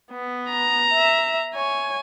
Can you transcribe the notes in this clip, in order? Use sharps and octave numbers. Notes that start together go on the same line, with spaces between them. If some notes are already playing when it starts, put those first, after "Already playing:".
B3
A#5
E5
C#5 G#5